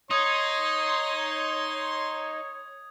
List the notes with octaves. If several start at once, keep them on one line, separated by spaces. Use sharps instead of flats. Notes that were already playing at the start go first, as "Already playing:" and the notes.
D#4 C#5 C6 D#6 G#6